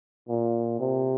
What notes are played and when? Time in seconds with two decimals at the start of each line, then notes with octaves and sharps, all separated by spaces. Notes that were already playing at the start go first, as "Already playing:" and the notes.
0.29 A#2
0.80 C3